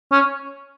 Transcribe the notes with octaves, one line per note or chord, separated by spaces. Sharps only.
C#4